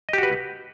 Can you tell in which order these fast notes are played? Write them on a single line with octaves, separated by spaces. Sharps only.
D#5 G4 F#4 B4